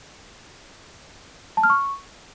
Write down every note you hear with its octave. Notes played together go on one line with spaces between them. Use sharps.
A5
F6
C#6